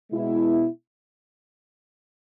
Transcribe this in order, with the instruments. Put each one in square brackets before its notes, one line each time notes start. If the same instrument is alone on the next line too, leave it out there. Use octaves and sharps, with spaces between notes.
[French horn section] B2 G#3 B3 E4